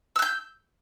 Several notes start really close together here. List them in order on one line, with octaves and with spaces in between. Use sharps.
E6 F#6 G6